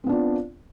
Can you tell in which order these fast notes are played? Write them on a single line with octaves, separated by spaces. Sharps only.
C4 B3 D4 F4